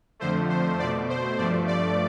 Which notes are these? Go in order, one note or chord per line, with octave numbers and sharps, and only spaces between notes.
F2 D3 F3 A3 C5
C5
B2 A3 D5
C5
G2 F3 A3 D5
D5